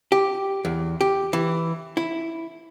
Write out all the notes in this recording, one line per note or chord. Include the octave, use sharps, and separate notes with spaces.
G4
E2
G4
E3
E4